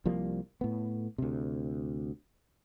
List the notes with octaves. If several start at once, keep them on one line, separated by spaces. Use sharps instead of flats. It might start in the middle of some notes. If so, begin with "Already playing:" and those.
C2 F3 G3 A#3
A2 B3
D2 C3